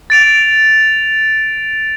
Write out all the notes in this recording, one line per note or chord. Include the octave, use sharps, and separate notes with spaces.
A6 D7 F7